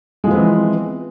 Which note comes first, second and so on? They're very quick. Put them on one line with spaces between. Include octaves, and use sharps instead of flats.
G#3 F3 B3 C4 E3